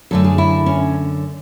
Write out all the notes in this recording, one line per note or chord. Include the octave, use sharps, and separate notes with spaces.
F#2 D3 A3 A4
G#4
E4
C#4